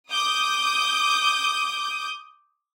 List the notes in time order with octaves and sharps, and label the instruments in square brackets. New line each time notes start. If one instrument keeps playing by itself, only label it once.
[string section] D6 D#6 G6